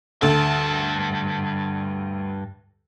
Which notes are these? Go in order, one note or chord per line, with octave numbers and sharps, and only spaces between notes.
D2 G2 A4 A5